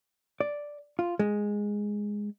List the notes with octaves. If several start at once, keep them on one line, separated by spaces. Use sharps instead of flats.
D5
F4
G#3